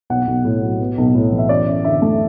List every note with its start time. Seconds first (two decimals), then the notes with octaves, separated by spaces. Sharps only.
0.10 B1 F#5
0.27 B1
0.45 A2
0.62 F#3
0.80 B3
0.98 B1
1.15 A2
1.32 E3
1.38 E5
1.49 F#2 D5
1.67 F#2
1.85 D3 E5
2.02 A3